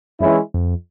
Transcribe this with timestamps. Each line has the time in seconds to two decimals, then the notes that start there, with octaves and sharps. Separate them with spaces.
0.20 F#2 E3 G#3 C#4 E4
0.54 F2